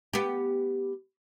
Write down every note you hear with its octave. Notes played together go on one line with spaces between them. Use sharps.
B3 G4